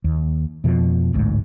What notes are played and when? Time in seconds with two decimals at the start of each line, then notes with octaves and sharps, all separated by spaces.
0.04 D#2
0.64 F2 B2 F3
1.13 A1 D2 G#2